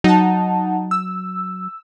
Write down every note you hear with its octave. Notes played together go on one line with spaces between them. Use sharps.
F#3 D#4 F#5 A5
E6